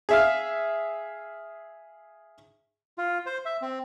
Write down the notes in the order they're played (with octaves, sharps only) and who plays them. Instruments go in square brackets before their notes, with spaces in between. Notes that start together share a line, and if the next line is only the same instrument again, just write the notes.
[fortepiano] G#4 E5 F5
[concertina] F4
C5
E5
C4